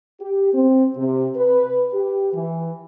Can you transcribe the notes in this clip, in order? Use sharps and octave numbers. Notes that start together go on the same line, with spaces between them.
G4
C4
C3
B4
G4
E3